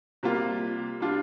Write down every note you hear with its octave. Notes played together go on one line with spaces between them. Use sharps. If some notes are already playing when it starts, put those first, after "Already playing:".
C3 G3 A#3 F4
G3 D4 F4